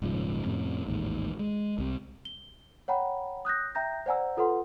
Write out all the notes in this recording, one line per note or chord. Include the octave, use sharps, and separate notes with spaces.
D#1 G#2 C#3 F3
F2 A2 C3 C#4
A1 D#2 G#2
G#3
C2 C3
G7
C#5 F#5 G5 A#5 B5
D#6 F#6 G6 A#6
E5 G5 A#5 G6 A#6
C5 D5 F#5 G#5 A#5 E6
F4 A4 B4 F#5 C6